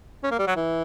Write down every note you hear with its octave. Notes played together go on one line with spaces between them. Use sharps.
C#4
A#3
G3
F#3
E3